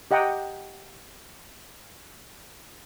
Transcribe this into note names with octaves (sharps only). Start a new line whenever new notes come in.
G4 D#5 F#5 G5 A#5 D#6